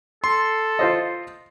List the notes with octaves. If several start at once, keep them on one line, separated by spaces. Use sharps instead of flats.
A4 C6
F4 C5 D#5